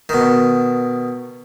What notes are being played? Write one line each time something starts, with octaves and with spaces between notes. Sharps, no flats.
B2 D#3